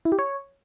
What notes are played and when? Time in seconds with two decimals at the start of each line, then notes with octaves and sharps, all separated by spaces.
0.05 E4
0.12 G4
0.19 C#5